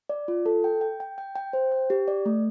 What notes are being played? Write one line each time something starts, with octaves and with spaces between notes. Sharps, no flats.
D5
F4
A4
G5
G5
G5
G5
G5
C5
G5
G4
D5
A3